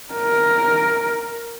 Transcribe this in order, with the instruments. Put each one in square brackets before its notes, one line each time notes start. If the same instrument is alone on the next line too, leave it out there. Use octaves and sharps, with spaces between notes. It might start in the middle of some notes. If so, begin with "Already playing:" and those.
[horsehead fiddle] A#4